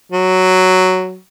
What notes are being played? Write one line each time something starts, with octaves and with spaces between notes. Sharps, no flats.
F#3